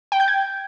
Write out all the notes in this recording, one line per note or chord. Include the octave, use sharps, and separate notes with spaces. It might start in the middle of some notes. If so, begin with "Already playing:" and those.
G5
G6
G#6